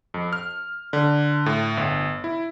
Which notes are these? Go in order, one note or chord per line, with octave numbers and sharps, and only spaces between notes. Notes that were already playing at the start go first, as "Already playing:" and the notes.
F2
F6
D3
A2
G1
E4